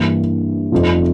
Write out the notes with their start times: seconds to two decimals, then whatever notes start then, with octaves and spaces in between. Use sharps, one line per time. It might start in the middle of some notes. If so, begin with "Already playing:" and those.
Already playing: G2 E3 A#3
0.72 F1 F2 C3 F3